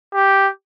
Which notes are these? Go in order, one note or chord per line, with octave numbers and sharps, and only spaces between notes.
G4